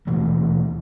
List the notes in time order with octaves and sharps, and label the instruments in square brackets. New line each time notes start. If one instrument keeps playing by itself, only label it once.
[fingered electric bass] D#2 B2 E3 A3